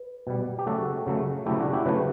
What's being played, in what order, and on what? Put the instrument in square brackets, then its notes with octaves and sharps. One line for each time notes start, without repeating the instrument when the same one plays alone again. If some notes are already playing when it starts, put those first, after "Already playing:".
Already playing: [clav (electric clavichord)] B4
B2 G3
G4
C#3 F#3 A3 F#4 A4
C#3 F#3 A3
C#3 F#3 A3 E4 G4
D4 F#4
E4 G4
C#3 F#3 A3 G4 B4